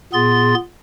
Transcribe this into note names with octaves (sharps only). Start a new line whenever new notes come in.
A#2 B3 G#4 C6 A6